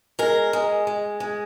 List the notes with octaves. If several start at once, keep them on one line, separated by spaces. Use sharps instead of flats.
G#3 A#4
G#3
G#3
G#3